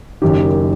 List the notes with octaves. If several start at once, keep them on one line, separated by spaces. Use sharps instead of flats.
F#1 F#2 D#3 G4